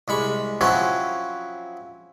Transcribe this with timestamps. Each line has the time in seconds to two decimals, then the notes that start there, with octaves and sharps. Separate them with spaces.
0.08 C2 G#3 B5 C#6
0.61 F3 F#3 C4 C#4 E4 F#4